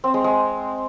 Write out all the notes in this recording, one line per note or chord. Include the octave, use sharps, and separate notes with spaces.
C4
G#3
G#3